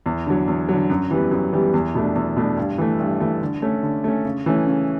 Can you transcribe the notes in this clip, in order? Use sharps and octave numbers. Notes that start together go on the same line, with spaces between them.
E2
D3 F#3
E2
D3 F#3
F#2
E3 G3 B3
F#2
E3 G3 B3
E2
B2 A3 D4
E2
B2 A3 D4
G2
E3 A3
G2
E3 A3
D3
A3 C#4
D3
A3 C#4
C#3
E3 A3 C#4
C#3